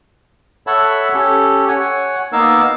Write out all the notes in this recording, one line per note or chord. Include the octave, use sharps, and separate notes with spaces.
A4 C#5 E5 F#5 A5 B5
C#4 G4 A4
C#5 F#5 G#5
A#3 B3 D#4 A#4 F5 E6